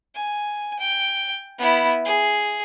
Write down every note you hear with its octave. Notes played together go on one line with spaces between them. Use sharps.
G#5
G5
B3 E4
G#4